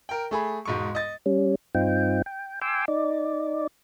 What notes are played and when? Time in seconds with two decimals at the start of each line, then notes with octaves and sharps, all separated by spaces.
0.09 A#4 G5
0.31 A3 G#4 B5
0.65 E1 G#2 C#6
0.95 D#5 A6
1.26 G3 C#4
1.75 G2 C4 D#4 F4 G5
2.26 G5
2.62 G5 G#5 C6 D6 E6
2.88 D#4 D5